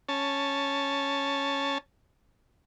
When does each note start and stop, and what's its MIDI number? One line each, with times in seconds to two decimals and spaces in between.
0.09 1.78 61
0.09 1.78 81